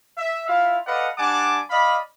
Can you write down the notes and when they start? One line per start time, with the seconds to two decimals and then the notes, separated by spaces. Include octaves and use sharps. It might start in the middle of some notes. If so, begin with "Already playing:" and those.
0.18 E5
0.48 E4 F4 E5 F5
0.86 A4 B4 D5 D#5 F5 F#5
1.18 G3 D4 F#5 G#5 A5 D6
1.70 D5 D#5 F5 B5